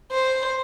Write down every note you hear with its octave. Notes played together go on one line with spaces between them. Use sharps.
C5